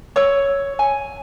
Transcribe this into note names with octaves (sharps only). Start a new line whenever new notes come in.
C#5 E6
G#5